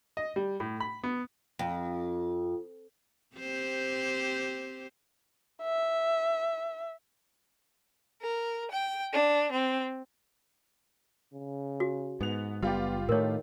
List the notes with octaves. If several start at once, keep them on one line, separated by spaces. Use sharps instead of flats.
D#5
G3
A2
B5
B3
F2
C4 G4 C5
E5
A#4
G5
D4
C4
C#3
F#4
G#2 B3 F7
F#1 G3 B3 F4 G4
A2 D#3 A3 A#4 C#5